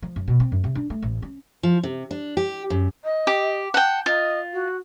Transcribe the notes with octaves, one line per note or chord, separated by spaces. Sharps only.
F3
F#2
B2
C4
F#2
C3
D4
A3
A1
C#4
F3
C3
D4
G4
F#2
D#5
G4
F#5 G5 A5
F4 D#5
F#4